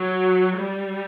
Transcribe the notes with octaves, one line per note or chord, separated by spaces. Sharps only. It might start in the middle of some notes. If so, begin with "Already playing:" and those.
Already playing: F#3
G3